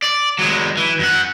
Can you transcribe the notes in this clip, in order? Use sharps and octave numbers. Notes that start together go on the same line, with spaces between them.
D5
F#3 G#3
E3
F#2 F#5